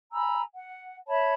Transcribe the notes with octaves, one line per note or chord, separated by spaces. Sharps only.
G#5 A#5 B5 E6
F#5
C#5 E5 A5 B5